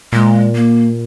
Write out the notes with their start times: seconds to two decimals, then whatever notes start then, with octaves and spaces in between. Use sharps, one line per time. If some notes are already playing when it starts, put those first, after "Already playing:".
0.13 A#2 G#3
0.55 A#3